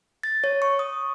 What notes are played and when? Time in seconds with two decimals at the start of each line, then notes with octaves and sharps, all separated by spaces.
0.23 A6
0.44 C#5
0.62 C#6
0.79 D#6